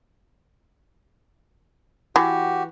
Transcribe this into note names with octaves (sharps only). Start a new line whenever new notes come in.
E3 F#4 G4